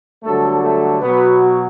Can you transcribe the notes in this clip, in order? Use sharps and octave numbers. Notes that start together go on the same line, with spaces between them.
G2 D3 F#3 A3 A4
A3 A4
B2 F#3 B3 B4